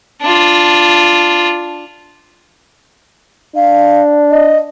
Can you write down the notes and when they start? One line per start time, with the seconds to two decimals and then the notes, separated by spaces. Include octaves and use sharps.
0.22 D4 F4
3.56 D4 F5
4.31 D#5